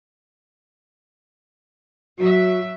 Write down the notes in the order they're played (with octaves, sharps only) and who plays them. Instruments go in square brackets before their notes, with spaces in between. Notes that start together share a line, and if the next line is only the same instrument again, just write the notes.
[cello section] F#3 E5 [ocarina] F#4